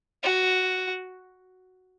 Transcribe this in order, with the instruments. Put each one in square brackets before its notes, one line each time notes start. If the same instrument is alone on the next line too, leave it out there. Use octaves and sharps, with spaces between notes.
[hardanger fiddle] F#4